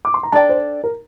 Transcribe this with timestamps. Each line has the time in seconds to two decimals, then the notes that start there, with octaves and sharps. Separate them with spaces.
0.05 D6
0.14 C6
0.23 A#5
0.32 D4 A4 D5 G5 A5
0.49 C5
0.84 A#4